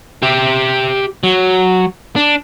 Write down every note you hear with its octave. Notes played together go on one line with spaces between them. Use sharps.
G4 E5
F#3
D4